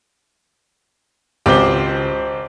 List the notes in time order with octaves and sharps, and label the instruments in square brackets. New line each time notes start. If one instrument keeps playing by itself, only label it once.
[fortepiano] G#1 [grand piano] C#2 D6 G7 [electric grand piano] G4 C5